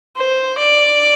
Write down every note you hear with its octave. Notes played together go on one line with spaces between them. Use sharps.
C5
D5